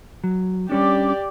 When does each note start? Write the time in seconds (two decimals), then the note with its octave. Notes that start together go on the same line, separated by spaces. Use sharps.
0.24 F#3
0.69 G3 C#4 D4 G4 D5